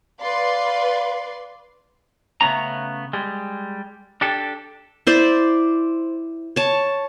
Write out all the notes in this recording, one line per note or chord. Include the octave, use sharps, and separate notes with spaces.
B4 D5 F5 C6
C#3 A3 B3 C#4 A#5
G3 G#3
D4 G4 A4
E4 C5 D5
C#5 A5